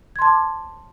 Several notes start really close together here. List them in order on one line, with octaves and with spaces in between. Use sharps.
G#6 C6 A5 D6